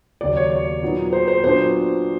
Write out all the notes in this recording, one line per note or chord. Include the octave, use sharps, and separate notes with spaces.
D#2 C#3 F#3 D5
C#5
C#5
A#2 F#3 B3 D#4
C5
C5
A#2 F#3 B3 D4 C5